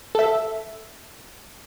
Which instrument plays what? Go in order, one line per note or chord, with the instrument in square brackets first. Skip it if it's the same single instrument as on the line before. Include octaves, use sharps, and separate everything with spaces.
[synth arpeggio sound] A4 E5